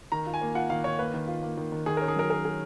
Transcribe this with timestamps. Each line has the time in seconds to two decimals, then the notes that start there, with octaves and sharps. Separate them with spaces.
0.12 D#3 A#5
0.26 F4
0.34 G#5
0.41 A#3
0.55 F4 F#5
0.70 D#3 F5
0.84 D#3 C#5
0.99 A#3 B4
1.14 D#3
1.27 F4
1.43 A#3
1.57 D#3
1.72 D#3
1.86 D#3 G#4
1.97 C#4 A#4
2.08 G#4
2.16 F#3 A#4
2.30 G#4 A#4
2.45 G#4